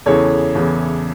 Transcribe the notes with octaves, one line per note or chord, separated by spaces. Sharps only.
E2 C#3 E3 A4 C#5
E2 C#3 E3